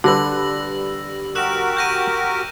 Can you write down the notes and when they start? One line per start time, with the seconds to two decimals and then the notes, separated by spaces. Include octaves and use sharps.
0.04 D3 G3 B4 E6 A#6 F#7
1.35 F#4 G4 A#4 E6 F#6 E7
1.77 G6 A#6 D#7